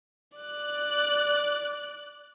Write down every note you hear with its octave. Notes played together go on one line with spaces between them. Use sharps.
D5 F#6